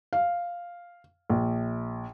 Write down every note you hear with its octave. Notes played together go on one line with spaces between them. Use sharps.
F5
A#1